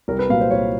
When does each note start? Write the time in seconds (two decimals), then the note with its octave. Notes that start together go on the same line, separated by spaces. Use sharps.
0.08 C2 A#4
0.19 B4
0.29 A#2 F#3 F5
0.41 C5
0.51 C2 C#5